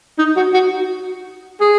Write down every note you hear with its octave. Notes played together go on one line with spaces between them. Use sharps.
D#4
F#4
F#4
G#4